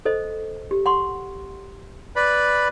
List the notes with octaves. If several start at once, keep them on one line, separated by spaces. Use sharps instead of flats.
A4 C5 D#5
G4
F#5 C6 C#6
B4 D5 B5